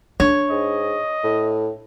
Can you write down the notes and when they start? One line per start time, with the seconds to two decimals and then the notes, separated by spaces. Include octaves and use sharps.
0.20 D4 C#5
0.51 G#2 D#5
1.24 A2